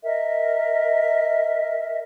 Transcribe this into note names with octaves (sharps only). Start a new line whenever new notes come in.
A#4 D#5 E5